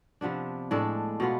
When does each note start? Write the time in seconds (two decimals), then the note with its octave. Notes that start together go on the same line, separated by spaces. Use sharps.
0.21 C3 F3 B3 D4
0.71 A2 G#3 D4 A4
1.20 B2 B3 F4